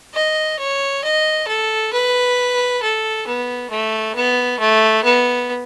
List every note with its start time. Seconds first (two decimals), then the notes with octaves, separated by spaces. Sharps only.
0.14 D#5
0.59 C#5
1.04 D#5
1.48 A4
1.93 B4
2.82 A4
3.27 B3
3.70 A3
4.15 B3
4.59 A3
5.04 B3